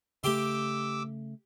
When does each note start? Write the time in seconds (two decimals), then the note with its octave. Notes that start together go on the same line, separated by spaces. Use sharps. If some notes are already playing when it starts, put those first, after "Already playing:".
0.24 C#3 A3 G4 G5 C6 D6 E6